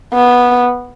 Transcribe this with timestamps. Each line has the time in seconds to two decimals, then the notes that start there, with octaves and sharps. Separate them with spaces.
0.14 B3